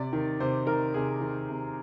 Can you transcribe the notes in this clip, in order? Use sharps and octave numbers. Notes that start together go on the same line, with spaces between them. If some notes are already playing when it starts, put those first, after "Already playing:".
Already playing: C3 D5
D#3
C3 C5
D#3 A#4
C3 G#4
D#3
C3